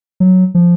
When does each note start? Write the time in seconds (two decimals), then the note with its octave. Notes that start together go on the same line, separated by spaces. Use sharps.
0.20 F#3
0.55 F3